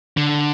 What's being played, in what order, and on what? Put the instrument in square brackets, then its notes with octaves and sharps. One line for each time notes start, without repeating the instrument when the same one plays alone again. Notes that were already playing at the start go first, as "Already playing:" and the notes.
[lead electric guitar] D3